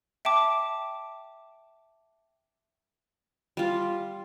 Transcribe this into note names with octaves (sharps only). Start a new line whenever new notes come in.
E5 G5 A5 D6
G3 F4